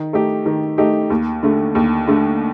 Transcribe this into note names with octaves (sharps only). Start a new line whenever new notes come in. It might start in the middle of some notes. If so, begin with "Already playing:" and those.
Already playing: D#3
A3 D#4 G4
D#3
A3 D#4 G4
D#2
D3 A3
D#2
D3 A3